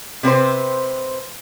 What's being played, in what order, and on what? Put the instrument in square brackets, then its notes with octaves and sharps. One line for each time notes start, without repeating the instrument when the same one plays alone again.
[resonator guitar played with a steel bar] C3 C4 B4 C5